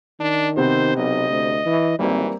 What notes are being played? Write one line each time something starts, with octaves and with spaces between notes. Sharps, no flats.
D#3 D4
C3 B3 C4 C5
B1 D#5
D2
E3
G#1 E3 G3 A#3 C4